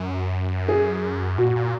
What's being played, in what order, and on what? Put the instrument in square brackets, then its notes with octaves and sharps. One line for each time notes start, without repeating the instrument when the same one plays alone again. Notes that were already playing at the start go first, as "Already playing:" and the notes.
Already playing: [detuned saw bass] F#2
[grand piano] G#4
[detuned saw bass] A#2 [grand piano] F#4
[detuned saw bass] A#2